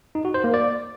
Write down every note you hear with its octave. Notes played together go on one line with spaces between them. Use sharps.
D#4
F#4
C5
A#3
D5